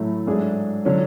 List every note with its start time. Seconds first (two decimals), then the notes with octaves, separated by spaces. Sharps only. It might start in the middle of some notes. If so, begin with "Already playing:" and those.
Already playing: A2 F#3 A3 E4
0.26 G#2 F#3 A3 D4 G#4
0.85 D3 F#3 C#4